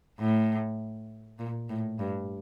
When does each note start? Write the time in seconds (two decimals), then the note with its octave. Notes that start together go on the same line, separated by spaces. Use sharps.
0.19 A2
1.39 A#2
1.69 A2
1.99 G2